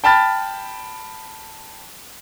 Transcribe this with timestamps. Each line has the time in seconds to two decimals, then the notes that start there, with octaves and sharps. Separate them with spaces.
0.04 G5 A5 B5 F6 A6